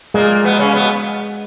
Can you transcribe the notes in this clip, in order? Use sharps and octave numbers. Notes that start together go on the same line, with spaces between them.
A#2 G#3 A#3
B2 B3
C#3 C#4
B2 B3